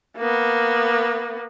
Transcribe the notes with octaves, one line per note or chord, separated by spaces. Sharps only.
A#3 B3